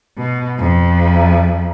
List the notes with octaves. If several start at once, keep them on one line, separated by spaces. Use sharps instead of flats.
B2
F2